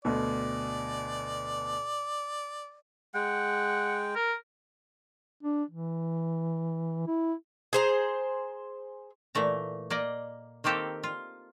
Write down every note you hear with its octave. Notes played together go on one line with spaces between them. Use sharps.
D2 B2 D5
G#3 F#5 G5
A#4
D4
E3
E4
G#4 C5 A#5
A#2 E3 A3 A#5
A#3 D5 D#5
D#3 A#3 C4 G4 A4
F4